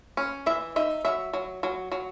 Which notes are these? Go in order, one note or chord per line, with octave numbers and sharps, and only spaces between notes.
C#4
E3 E5
D#4 E5
F#3 E5
F#3
F#3
F#3